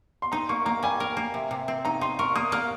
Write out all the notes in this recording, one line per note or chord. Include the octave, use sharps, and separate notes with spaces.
C6
D#4 A#5
A#3 C#6
A#3 A#5
G3 G#5
A#4
A#3
C3
C3
C4
D#4 A#5
D#4 C6
A#4 C#6
A#3 D#6
A#3 F6